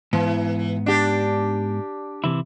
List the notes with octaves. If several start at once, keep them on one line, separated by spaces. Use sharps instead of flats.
G#2 E3 B3
D4 G4
C3 E3 E4